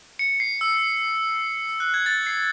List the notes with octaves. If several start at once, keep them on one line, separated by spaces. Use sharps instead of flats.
C#7
C7
E6
E6
F#6
G#6
A6
C7